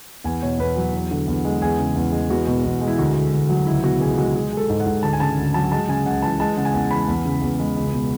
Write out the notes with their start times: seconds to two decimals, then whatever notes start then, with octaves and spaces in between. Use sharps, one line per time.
0.24 E2 G#5
0.42 B2 C#5
0.59 E2 B4
0.76 F#3
0.93 E2
1.11 D3
1.28 E2
1.45 G#3
1.62 E2 G#4
1.78 C#3
1.96 E2
2.12 G#3
2.30 E2 F#4
2.47 B2
2.64 E2
2.81 G#3
2.88 E4
2.98 D2 F#4
3.15 D3
3.33 D2
3.49 F#3
3.66 C#2 E4
3.83 B2 F#4
4.01 C#2 G#4
4.18 G#3 F#4
4.35 G#3 G#4
4.53 G#3 A4
4.69 G#2
4.80 F#5
4.86 G#2
5.03 D2 A5
5.13 G#5
5.20 C#3 A5
5.37 D2
5.54 F#3 A5
5.71 G#3 A5
5.88 C#3 G#5
6.06 C#2 F#5
6.22 E3 A5
6.40 G#3 A5
6.57 C#3 F#5
6.65 G#5
6.74 E2 F#5
6.91 E3 B5
7.08 E2
7.25 C#3
7.42 E2
7.59 G#3
7.77 C#2
7.93 B2